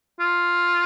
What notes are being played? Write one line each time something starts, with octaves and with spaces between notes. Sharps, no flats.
F4